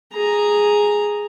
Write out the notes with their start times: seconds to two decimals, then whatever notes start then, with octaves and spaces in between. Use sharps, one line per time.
0.13 G#4 A#5